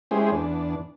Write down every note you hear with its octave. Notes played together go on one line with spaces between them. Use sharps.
G#3 C#4 E4 G4 G#4 C5
E2 D4